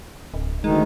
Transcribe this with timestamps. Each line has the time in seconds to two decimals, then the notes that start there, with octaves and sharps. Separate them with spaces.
0.34 D1
0.64 D2 D#3 G#3 D#4